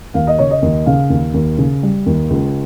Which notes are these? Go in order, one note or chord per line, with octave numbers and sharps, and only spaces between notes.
D#2 F5
D#5
C#3 C#5
D#5
D#2
C#3 F5
D#2
D#2
C#3
G3
D#2
C#2